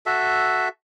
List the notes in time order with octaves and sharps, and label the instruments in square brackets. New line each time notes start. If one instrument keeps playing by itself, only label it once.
[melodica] F#4 A4 E5